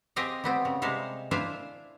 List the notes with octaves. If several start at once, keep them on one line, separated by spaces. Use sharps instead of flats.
C4 G4 G#4 D#5 F5 G5
G3 B3 C4
C#3
C3 G3 G#3 A4 F5
D4 E4 F4 C5 F5 G#5